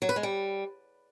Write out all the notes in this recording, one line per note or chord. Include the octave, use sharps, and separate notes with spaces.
F#3
B4
G#3
G3